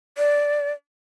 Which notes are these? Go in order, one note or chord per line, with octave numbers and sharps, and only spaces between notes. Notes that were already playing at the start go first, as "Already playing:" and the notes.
D5